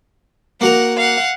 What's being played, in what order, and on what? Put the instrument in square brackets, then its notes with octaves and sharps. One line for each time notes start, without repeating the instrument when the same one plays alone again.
[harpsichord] A#3 F#4 A#4 [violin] F#5
[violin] F5 F#5